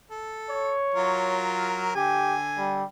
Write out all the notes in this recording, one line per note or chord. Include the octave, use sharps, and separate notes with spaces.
A4
C#5
F#3 F4 A#4
D3 G4 G#5
G3